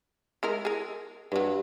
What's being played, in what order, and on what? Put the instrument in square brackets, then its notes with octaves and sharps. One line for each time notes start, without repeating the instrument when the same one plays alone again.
[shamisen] G#3 E4 A#4
G#4 A#4
[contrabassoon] G2 [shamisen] E3 F#3